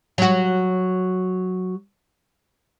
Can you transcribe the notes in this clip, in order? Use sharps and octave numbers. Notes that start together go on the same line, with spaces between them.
F#3 F#4